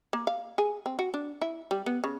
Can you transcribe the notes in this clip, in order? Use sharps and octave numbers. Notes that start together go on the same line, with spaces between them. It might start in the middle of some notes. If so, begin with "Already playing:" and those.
A#3
F5
G#4
C4
F#4
D4
E4
G3
B3
C#3